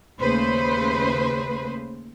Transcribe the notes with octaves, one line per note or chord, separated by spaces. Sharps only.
D#2 C#3 A3 B4 C5